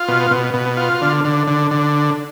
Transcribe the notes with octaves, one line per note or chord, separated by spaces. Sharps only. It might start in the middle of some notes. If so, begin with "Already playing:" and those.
Already playing: F4
B2
B2
B2
F4
D3
D3
D3
D3